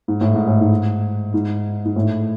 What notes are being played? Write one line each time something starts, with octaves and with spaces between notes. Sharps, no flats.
G#2
A2
G#2
A2
G#2
G#2
G#2
A2